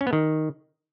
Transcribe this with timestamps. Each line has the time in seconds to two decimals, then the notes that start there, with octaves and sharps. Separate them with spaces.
0.01 C#4
0.07 B3
0.13 D#3